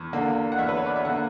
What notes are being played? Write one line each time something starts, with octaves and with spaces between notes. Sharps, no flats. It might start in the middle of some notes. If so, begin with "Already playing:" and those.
Already playing: E2
D3 A#3
F#5
E2 E5
B4
C#5
D5
E5
D3 A#3 F#5